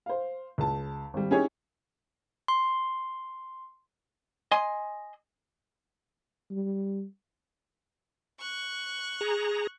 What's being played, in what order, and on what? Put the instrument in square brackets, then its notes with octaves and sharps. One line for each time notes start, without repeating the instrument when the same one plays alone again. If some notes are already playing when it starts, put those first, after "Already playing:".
[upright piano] C5 F5
C#2 A5
G#1 G3
C#4 D#4 E4 G4 G#4 C#5
[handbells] C6
[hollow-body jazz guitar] D#5 G#5 C6
[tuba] G3
[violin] C#6 F#6
[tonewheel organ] G#4 A#5